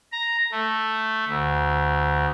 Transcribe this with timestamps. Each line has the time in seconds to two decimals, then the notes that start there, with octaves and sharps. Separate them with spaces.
0.12 A#5
0.52 A3
1.28 D2